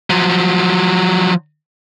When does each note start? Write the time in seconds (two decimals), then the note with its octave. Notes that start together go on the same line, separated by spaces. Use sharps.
0.10 F3 F#3